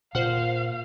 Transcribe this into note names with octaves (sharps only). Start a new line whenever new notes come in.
A#2 F4 C5 F5 F#5